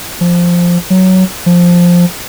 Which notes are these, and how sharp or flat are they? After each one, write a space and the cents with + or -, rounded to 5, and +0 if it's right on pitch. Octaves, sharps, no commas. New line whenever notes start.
F3 +0
F#3 +10
F3 +5